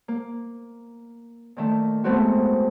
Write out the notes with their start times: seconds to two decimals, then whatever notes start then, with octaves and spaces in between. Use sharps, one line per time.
0.08 A#3
1.56 A#2 D#3 A3
2.04 G#3 A3 B3 C4 E4 F#4